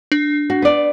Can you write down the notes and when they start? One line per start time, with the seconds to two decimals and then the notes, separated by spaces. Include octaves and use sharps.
0.12 D4
0.50 F#4
0.62 B3 D5